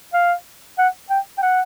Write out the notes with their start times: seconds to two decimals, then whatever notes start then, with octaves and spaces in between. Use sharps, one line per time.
0.14 F5
0.78 F#5
1.10 G5
1.38 G5
1.42 F#5